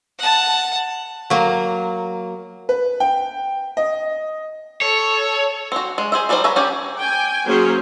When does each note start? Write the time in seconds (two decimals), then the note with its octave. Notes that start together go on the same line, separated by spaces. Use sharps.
0.19 F#5 A5
1.30 F#3 A#3
2.69 B4
3.00 G5
3.77 D#5
4.81 A4 C#5
5.72 C4 F#4
5.98 G#3
6.12 G#4 C5 E5
6.29 F#3 G3 D#4 G#4 C5
6.44 B4 C#5 E5 F#5 A#5
6.56 C#4 G4 G#4
6.98 G5 G#5
7.46 F#3 A#3 C#4 G#4 C5 C#5